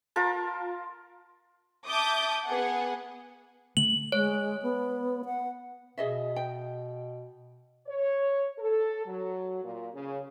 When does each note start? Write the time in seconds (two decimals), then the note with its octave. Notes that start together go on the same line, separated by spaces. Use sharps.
0.16 F4 A#4 A5
1.87 E5 A5 D6 D#6 G6
2.45 B3 G#4 F#5
3.77 D3 A3 F#7
4.12 G#3 C#5
4.62 B3
5.26 F#5
5.98 B2 G#4 D#5 E5
6.36 G5
7.87 C#5
8.58 A4
9.06 F#3
9.63 A#2
9.94 C#3